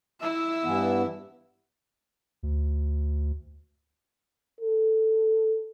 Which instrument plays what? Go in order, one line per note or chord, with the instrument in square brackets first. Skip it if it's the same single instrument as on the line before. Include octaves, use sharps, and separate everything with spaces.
[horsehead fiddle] E4 E5
[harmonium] G2 E3 B3
[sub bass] D2
[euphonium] A4